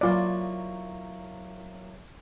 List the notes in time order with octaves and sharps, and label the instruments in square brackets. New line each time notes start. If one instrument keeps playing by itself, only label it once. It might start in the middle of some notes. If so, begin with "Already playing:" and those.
[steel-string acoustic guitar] F#3 A#3 E4 [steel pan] F4 D5